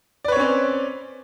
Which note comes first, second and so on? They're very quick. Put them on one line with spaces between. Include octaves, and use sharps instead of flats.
D5 B4 C#5 C4 C#4